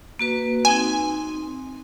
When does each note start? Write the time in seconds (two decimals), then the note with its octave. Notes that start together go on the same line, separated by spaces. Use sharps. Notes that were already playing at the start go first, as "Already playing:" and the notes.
0.19 A#3 F#4 B4
0.65 C4 D#4 G#5